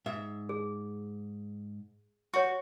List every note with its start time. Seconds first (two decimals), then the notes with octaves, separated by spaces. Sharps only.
0.06 G#2 E5
0.49 G#4
2.34 F#4 C#5 C#6